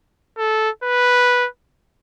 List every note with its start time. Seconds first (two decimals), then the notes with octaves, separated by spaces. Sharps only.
0.38 A4
0.84 B4